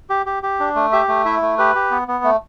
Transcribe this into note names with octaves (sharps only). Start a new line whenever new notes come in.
G4
G4
G4
D4
A3
G4 E5
A3
E4 E5
A3
G4 B4
G4
B3
B3
A3